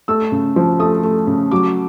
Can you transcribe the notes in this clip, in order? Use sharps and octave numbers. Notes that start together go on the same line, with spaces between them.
A3 E6
C#3
F3
A3 D#6
A3
C#3
F#3 D6